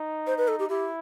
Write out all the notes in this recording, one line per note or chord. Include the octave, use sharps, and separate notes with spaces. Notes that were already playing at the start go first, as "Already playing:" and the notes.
Already playing: D#4
C5
B4
A4
G4
E4 G4